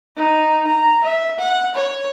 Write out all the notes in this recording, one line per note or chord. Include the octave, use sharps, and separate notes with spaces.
D#4
A#5
E5
F#5
C#5